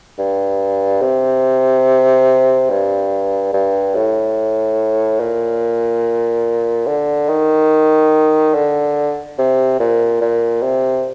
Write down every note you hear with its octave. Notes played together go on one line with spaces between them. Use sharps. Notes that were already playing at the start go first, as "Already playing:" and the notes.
G2
C3
G2
G2
A2
A#2
D3
D#3
D3
C3
A#2
A#2
C3